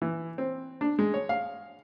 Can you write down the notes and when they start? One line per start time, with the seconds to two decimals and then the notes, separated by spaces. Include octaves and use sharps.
0.02 E3
0.38 C4
0.81 D4
0.99 G#3
1.14 C#5
1.29 F5